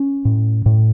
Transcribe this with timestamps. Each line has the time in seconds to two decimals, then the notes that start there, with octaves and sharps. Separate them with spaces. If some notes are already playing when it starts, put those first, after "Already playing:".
Already playing: C#4
0.25 A2
0.66 A2